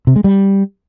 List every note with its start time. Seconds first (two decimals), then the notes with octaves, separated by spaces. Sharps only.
0.07 C3
0.16 G#3
0.24 G3